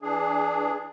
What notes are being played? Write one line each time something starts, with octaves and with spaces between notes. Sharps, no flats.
E3 D4 G#4